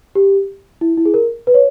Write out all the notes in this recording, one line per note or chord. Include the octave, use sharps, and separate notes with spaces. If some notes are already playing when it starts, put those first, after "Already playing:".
G4
E4
E4
G#4
A#4
B4
C#5